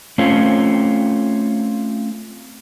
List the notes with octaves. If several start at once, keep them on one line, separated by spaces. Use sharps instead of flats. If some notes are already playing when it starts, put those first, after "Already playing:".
A3 C4 C#4 F4